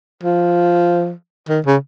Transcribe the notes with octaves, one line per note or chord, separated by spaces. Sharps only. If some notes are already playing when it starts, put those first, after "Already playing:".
F3
D#3
C#3